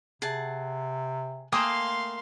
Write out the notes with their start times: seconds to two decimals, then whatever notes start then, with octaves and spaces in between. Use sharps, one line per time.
0.22 C3 G#4 F#5 A5
1.52 A3 A#3 F5 G5 G#5 C6 D#6